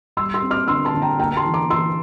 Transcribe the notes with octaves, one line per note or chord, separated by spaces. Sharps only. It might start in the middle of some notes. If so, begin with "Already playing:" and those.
G3 C6 E6
C6 E6
C4
D6 F6
D3 C6 E6
A5 C6
D3
G5 A#5
A#3 G5 A#5
A#5
A5 C6
E3
A#5 D6
E3 C6 E6